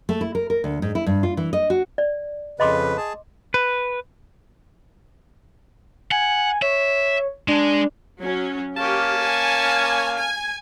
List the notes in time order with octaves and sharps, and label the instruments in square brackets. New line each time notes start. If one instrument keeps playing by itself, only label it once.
[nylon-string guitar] A3
E4
A#4
A#4
D2
G#2
E4
G2
F4
E3
D#5
F#4
[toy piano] D5
[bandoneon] F2 C#3 B4 [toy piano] D#5 C6 D6
[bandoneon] G#4 A5
[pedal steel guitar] B4
[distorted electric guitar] F#5 [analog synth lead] G#5
[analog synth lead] C#5 [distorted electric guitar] E5
[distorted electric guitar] G#3 [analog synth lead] D4
[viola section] F#3 C#4
[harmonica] A#3 C#4 F5 [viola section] G4 [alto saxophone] A5
[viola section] G#5
G#5